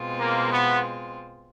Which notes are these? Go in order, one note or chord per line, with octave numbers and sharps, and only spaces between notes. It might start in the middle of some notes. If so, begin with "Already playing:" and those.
Already playing: B2 G#3 C4 F4
A#3
B3